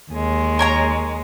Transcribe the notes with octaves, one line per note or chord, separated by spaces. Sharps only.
D#2 G#3
A#4 C#5 A#5